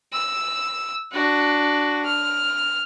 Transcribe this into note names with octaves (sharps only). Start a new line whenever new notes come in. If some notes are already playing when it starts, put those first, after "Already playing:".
E6
D4 F#4
F6